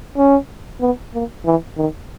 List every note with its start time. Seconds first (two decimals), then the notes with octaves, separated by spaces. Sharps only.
0.17 C#4
0.81 B3
1.14 A#3
1.45 E3
1.77 D#3